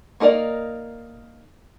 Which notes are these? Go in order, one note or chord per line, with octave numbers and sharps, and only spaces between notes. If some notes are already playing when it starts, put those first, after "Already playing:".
A#3 D#4 A#4 D5